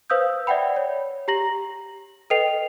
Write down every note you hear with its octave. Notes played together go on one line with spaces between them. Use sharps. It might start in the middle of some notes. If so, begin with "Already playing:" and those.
B4 C5 F5 D#6 E6 G6
D5 E5 F#5 G5 B5
C#5
G4 A#5 A#6 F#7
A4 B4 D#5 G5 C7 F7